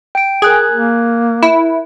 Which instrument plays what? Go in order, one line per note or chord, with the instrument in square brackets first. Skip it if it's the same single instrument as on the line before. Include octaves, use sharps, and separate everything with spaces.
[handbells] G5 D7
[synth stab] G#4 [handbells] A#4 F#6 G#6
[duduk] A#3
[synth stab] E4